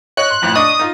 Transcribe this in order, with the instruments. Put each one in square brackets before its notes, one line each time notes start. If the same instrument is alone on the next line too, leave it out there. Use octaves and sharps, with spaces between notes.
[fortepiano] C#5 D#5 [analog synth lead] F#6
[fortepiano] C6
A1 F2 A2
[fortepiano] D4 D#5 C#6 [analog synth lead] D#6
[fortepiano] D#4 F4